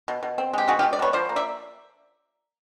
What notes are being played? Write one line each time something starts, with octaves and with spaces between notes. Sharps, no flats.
B2
B2
C4
G#3 G4
B2 F#4 G#4
F4 G4
G#3
D5
B2 B4 C#5
F3 C5 D5
A#3
D5 E5